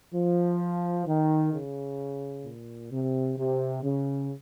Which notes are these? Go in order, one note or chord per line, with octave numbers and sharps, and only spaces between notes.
F3
D#3
C#3
A#2
C3
C3
C#3